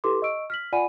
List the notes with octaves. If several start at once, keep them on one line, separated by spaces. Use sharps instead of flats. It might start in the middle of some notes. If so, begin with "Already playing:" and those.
E4 G4 A4 B4 C6 D6
D#5 C#6 E6 D7
F6 B6 F#7
F4 D5 F#5 G#5 B5 D#7